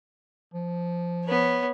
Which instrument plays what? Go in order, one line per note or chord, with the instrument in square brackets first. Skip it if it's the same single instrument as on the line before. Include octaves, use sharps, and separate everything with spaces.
[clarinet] F3
[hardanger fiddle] B3 C#5